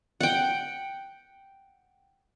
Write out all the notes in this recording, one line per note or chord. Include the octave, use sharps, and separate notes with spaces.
F#5 G5